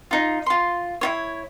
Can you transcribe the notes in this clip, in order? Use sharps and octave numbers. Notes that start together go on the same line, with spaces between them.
D#4 F4
F4 C6
E4 F4 C#5